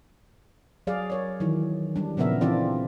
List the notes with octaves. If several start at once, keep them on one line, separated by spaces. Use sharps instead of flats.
F#3 G#4 D5 F5
A#4 C#5 D5
D#3 E3 F#3
G3 D4
A#2 C#3 F3 B3 A#4 E5
E3 C4 D4 F4 D5